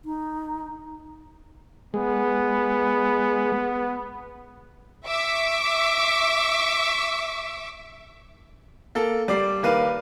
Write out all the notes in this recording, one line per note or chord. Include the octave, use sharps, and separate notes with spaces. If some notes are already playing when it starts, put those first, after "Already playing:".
D#4
G#3 B3
E5 C#6 D6 E6 B6
A#3 A4
G3 D5 D6 C7
D#2 A#3 B4 F5 D#7